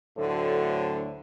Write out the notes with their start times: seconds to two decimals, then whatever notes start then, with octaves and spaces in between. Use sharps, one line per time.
0.18 D2 A2 D3 F#3 A4 C5